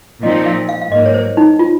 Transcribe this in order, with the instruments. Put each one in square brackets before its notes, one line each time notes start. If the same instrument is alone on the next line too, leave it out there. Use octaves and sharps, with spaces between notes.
[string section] A#2 F3 C4 D#4 [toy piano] D#5
[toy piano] F5
F5
F5
[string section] G#2 F#3 A#3 [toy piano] D#5
[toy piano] C#5
C5
D#4
F4